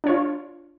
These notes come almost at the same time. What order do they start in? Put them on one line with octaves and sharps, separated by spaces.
D4 C#5 F4